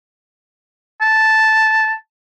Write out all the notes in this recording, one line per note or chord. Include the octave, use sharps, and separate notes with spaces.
A5